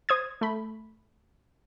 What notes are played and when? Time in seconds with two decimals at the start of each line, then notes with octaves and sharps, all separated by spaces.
0.09 C5 D#6 G#6
0.41 A3 B5